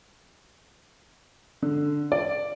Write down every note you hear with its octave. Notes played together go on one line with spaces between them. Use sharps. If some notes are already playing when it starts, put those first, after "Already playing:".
D3
D5